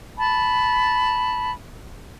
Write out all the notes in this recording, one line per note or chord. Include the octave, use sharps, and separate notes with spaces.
A5 B5